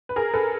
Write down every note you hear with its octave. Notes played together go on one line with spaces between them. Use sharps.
B4
G#4 A#4
A4 B4